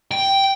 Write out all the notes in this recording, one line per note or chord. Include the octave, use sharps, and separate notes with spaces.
G5